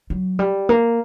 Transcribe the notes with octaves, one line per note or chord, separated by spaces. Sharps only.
F#3
G3
A#3